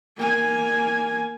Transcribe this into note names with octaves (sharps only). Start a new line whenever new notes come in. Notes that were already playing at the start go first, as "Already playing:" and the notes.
A#3 G#5